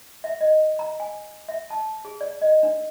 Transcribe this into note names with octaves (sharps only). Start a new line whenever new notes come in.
E5
D#5
A#5
G#5
E5
A5
G#4
D5
D#5
D4